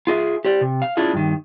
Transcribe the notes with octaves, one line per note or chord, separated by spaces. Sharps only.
F4 G#4 D#5 E5
G4 C5 D5
C3
F5
C#4 D4 E4 F4 G#4
G2 D#3